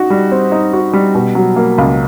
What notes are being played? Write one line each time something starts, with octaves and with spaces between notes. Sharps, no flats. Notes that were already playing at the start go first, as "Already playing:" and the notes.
Already playing: D#4 F#4
G3
C4
D#4
F#4
G3
B2
F#3
A#3
C#2